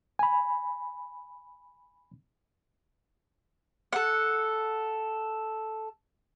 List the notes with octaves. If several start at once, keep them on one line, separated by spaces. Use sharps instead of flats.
G#5 B5
A4 F#5